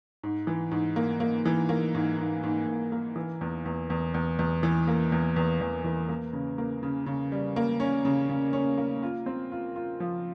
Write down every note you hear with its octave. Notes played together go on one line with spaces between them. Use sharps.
G#2
E3
G#2
A#3
A#3
E3
A#3
G#2
G#2
G#2
G#2
A#3
E3
E2
E2
E2
E2
E2
E3
A#3
E2
E2
E2
E3
A#3
C#3
A#3
C#3
C#3
G3
A#3
C#4
C#3
C#3
C#4
A#3
F4
C4
F4
F4
F3